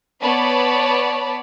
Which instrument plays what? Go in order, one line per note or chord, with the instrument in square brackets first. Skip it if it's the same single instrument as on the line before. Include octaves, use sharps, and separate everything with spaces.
[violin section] B3 C#5 D5 A5 B5